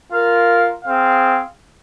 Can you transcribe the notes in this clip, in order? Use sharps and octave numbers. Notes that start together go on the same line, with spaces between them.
F4 A#4 F5
C4 G#4 F5